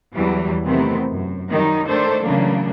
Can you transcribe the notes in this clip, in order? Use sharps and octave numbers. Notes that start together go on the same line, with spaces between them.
E2 E3 F#3 G3
C3 D#3 E3 A3 B3 C4
F#2
D#3 F#3 G3 D#4
D#3 A3 D4 A4 C5
C#3 E3 F#3 A3 A#3 D4